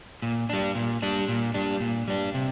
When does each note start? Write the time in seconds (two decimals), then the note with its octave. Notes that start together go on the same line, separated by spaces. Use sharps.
0.22 A#2
0.49 G3 D4
0.75 A#2
1.02 G3 D4
1.29 A#2
1.54 G3 D4
1.80 A#2
2.08 G3 D4
2.34 C3